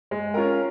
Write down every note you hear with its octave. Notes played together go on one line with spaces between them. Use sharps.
G#3
C#4 F4 A#4